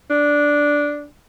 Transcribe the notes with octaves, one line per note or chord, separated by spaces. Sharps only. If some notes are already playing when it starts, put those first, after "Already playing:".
D4